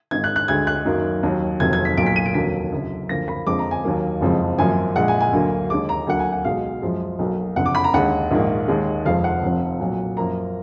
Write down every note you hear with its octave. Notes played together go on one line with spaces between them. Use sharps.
G#1 G#2 D#3 G#6
F#6
F#6
D2 D3 G#3 G#6
F#6
F#2 D#3 F#3 A#3
D#2 D#3 F#3
F1 D#2 D#3 F#3 G#6
G#6
B6
B1 A#2 F#3 A#3 D7
B6
D#7
D7
F1 D#2 D3 F#3 A#3 B6
F#1 F#2 D3
D2 D3 F3 A#3 A#6
B5
F2 D3 F3 G#3 D6
A#5
G#5
D#2 D#3 F#3 A#3
F#1 F2 F3 G#3
G#1 F#2 F3 A#3 G#5
A#1 A#2 G#3 F#5
G#5
G#5
D2 D3 F#3 A#3
D#2 D3 G#3 D6
A#5
D2 D3 F#3 A#3 F#5
G#5
F#5
B1 B2 G#3 F5
F#2 F3 G#3
B1 B2 F#3 A#3
F#1 F2 D3 F#5
D6
B5
A#5
D#2 D3 G#3 F#5
A#1 G#2 D#3 A#3
D#2 D#3 G#3
F1 F2 F3 G#3 F5
F#5
F1 F2 F3
B1 A#2 F#3
F#2 F3 A#3 A#5